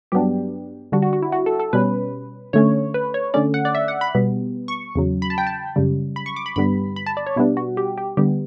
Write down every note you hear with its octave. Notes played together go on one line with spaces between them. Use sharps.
G2 F#3 B3 D4 G4
D3 G3 D4 F#4
F#4
F#4
E4
F#4
A4
A4
B2 G3 C#4 B4
D3 A3 C#4 C#5
B4
C#5
D3 A3 C#4 D5
F#5
D5
E5
F#5
B5
B2 G3 B3
C#6
E2 C#3 F#3
B5
A5
G5
A5
F#2 C#3 G3
B5
C#6
D6
B5
G2 D3 G3 B3 B5
B5
A5
D5
C#5
B2 G3 B3 D4 E4
F#4
G4
G4
D3 G3 B3 G4